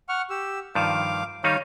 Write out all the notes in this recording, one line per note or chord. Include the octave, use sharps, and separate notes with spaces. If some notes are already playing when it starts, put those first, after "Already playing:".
F#5 C#6 F6
G4 E6
G2 D#3 F3 F5 D6
D#3 G3 D#4 C#5 F5